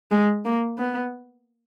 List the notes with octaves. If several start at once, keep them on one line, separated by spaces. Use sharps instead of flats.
G#3
A#3
B3